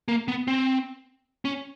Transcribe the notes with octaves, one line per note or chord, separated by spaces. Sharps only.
A#3
B3
C4
C#4